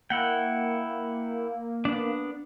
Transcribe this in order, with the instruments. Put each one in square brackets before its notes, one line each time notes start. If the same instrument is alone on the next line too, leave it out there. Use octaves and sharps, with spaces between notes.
[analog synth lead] A#3 [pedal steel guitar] E4 F#5 G5
[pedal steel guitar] B3 D4